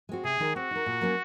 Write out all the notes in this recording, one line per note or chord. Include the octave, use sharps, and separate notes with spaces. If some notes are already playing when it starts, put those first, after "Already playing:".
G#3 C4 F#4
C3 G#4
D#3 G#3 D#4 A#4
C4 F#4
D#4 A#4
A#2
F#3 A#3 C#4